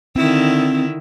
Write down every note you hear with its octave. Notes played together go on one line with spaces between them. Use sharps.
D3 D#3 C4 E4